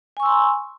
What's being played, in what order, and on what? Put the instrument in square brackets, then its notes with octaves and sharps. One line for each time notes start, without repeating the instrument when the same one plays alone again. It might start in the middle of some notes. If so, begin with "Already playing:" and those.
[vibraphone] G#5
C#6
E6
C6
A#5